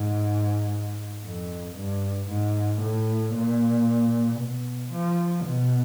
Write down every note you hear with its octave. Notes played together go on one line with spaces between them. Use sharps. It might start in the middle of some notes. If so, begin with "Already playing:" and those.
Already playing: G#2
F2
G2
G#2
A2
A#2
B2
F3
B2